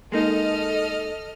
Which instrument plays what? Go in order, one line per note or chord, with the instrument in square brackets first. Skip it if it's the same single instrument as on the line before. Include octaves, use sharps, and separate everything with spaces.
[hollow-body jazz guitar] G#3 A#3 D#4 [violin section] A4 D#5 F6